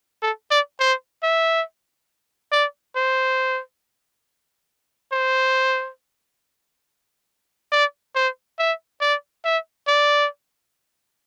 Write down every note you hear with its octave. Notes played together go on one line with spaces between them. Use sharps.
A4
D5
C5
E5
D5
C5
C5
D5
C5
E5
D5
E5
D5